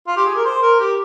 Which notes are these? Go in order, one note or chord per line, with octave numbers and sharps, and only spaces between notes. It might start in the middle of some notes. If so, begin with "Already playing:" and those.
F4
G4
G#4
A#4
C5
A#4
G4